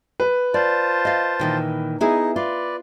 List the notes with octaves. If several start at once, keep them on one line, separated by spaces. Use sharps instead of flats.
B4
F4 C5 D5 A5
D#5 F5
A#2 D#3 E3
B3 D#4 E4 G#4
F4 B4 D5